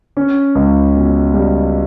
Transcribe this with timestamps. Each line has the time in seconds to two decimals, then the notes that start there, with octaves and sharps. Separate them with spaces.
0.17 C#4
0.55 C#2
0.94 B2
1.34 G3